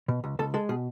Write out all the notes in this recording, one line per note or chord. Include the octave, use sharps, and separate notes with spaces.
B2
C#2
C#2 A4
G#3 A4
B2 G#4